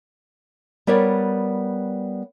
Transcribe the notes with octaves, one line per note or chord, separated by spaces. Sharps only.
G3 B3 A#4 C#5 D5